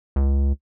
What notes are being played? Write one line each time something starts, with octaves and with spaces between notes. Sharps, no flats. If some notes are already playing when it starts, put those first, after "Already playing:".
C#2